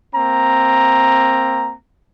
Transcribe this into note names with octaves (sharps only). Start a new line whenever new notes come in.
A#3 C4 A#5